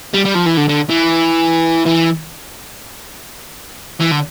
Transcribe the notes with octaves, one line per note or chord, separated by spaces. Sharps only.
G3
G3
F3
E3
D3
D3
E3
E3
E3
D3